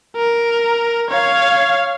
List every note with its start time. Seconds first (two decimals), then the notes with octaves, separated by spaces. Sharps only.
0.16 A#4
1.10 C#5 F5